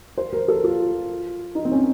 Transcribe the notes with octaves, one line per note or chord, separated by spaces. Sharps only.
C5
A#4
A4
F4
D#4
C4
C#4